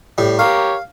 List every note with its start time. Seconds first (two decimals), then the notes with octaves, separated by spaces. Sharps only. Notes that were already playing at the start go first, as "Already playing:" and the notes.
0.18 A2 G3
0.39 G4 A#4 C#5 F5